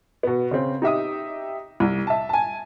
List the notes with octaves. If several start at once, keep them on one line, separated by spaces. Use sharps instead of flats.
B2 B3
C#3 C4
D#4 G4 E5 D#6
C2
E5 A5
G#5 A5